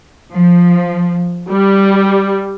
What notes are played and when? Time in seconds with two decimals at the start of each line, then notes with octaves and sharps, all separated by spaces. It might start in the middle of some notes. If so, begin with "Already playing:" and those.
0.32 F3
1.49 G3